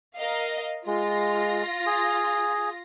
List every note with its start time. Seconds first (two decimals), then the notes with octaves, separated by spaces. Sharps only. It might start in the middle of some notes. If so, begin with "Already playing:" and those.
0.17 A#4 D#5 F5
0.87 G#3 F4 A#6
1.86 G#4